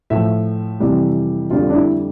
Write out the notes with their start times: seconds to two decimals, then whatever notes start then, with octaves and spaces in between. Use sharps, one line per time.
0.10 A2 F3 E5
0.80 F2 C3 E3 G3
1.50 F2 D3 G3 F4
1.70 D4
1.74 E4